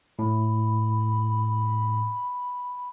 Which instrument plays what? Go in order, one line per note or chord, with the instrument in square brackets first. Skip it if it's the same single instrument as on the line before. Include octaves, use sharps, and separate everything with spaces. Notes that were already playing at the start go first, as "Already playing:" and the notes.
[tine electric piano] A2 [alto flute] B5